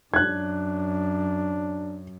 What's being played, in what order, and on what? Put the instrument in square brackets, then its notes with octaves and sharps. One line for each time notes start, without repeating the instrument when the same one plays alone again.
[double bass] F#2 [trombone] D4 [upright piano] F#6 G#6